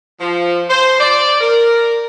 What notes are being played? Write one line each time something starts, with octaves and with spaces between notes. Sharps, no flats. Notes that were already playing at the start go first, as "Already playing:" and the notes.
F3
C5
D5
A#4